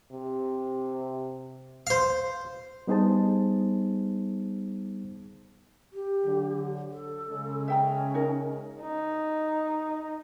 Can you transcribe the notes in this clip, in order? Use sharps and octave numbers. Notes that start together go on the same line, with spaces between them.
C3
C5 F5
G3 B3 D#4 G#4 C5 A5
G4
D3 F#3
A4
C#3 G#3
C#4 E5 G5 A#5
D#4 A#4
D#4